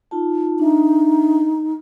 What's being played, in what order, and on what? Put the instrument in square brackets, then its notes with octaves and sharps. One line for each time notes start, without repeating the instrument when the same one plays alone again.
[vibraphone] D#4 F4 A5
[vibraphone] D4 E5 [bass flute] D#4